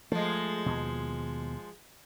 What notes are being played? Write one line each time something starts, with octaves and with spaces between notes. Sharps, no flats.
F3 G#3 A3
D#2 B2